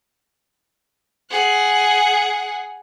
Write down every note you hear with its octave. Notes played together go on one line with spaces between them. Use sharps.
G#4 F#5